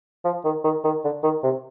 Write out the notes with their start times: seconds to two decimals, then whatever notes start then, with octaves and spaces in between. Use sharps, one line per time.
0.25 F3
0.45 D#3
0.64 D#3
0.84 D#3
1.04 D3
1.23 D#3
1.43 C3